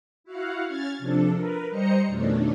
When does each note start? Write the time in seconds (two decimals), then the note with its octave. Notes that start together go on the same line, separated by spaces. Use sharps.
0.24 E4 F#4 F5 F#5
0.66 C#4 F6 G#6 A6
0.99 C3 F3 D4 A4
1.34 A#4 B4
1.70 G3 C5 D#5 A#5 C#7
2.07 F2 B2 D#3 A3 C#4 D4